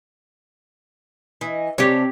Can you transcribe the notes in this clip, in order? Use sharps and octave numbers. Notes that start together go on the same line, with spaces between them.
E3 D#5
C3 G#3 C4 D4 G4 C#5